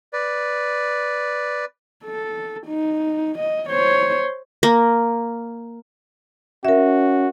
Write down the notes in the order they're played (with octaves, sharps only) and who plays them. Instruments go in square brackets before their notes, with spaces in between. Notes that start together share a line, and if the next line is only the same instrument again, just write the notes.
[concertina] B4 D5
[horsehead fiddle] A4
D#4
D#5
C5 C#5
[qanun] A#3
[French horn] C#4 [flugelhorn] F#4 [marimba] A#4 E5